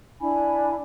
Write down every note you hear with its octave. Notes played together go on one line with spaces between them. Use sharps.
D4 E4 G#5 B5